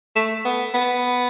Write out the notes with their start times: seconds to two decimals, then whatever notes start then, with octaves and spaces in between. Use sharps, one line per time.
0.16 A3
0.45 B3
0.74 B3